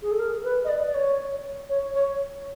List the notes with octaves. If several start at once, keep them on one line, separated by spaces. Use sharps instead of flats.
G#4
A4
A#4
B4
D#5
D5
D5
C#5
C#5
C#5